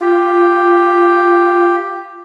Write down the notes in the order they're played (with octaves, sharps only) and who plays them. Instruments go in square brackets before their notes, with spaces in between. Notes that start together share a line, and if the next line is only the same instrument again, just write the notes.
[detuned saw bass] F4 [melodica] G4